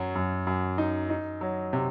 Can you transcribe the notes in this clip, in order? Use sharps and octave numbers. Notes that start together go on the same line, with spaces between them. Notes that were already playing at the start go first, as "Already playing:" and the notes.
Already playing: F#2 F#3
F#2
F#2
D#4
D#4
F#3
C3